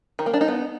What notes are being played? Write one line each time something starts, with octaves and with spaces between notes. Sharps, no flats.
D#3
A#3
D4
D#4
B3